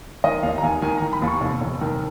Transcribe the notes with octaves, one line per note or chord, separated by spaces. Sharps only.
D#3 D#5
D#2 F5
A#5
D#2 G#5
D#3 G#5
A#5
D#3
B5
D#2
C#6
F1
F1
D#3